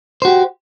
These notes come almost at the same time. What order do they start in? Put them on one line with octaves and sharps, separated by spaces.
C5 F#4 G4